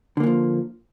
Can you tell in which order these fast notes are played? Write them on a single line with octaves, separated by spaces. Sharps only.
D3 A#3 E3 F3